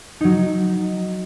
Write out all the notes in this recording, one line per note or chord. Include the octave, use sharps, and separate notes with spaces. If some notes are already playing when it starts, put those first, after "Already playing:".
F#3 D#4